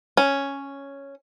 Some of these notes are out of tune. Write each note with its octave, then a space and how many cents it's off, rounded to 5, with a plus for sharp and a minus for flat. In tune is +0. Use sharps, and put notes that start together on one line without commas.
C#4 +0